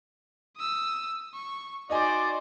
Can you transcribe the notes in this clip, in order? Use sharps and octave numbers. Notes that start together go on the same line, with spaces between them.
D#6 E6
C#6
D#4 F#4 C5 D5 D#5 G#5